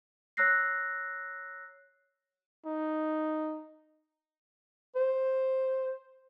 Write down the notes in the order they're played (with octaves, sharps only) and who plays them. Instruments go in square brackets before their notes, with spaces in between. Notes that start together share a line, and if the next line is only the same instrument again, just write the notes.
[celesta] C#5 A#5 E6 F#6 A#6 C7
[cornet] D#4
[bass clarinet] C5